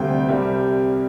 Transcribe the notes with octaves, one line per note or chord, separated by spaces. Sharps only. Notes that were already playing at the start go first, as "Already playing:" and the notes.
Already playing: D2 C3 G3 G5
C2 C3 G3